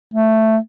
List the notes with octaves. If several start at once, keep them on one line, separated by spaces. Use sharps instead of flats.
A3